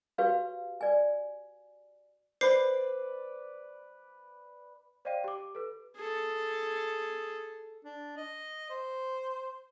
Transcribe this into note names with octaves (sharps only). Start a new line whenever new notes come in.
F#4 G4 B4 C#5 F5
D5 G#5
B4 C5 D5 C7
C5 D5 D#5 F5 G5 D#7
G4 D6
A4 B4
G#4 A4
D4
D#5
C5